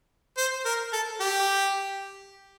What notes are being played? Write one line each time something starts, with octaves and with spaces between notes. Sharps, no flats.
C5
A#4
A4
G4